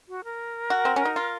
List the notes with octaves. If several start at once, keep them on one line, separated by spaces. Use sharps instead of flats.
F#4
A#4
F#4
C4
C#4
D#4
F4